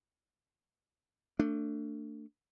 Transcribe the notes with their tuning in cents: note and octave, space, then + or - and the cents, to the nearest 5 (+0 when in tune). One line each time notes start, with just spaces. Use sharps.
A3 +30 D4 +0